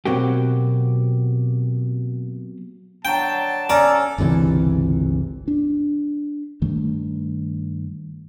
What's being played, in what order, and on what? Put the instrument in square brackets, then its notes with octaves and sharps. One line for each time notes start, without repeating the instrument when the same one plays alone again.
[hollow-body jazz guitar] B2 F#3 A#3 C4 F#4 G4
[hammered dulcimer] D3 F#3 [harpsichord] G5 [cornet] A5
[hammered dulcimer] C#4 [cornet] A4 [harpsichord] D5 [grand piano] A#5
[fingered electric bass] G1 C#2 C3 E3
D4
G2 D#3 A3